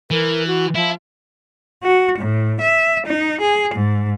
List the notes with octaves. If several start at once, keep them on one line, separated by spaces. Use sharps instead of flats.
E3 A#4
F#4
F3 E4
F#4
A2
E5
D#4
G#4
G#2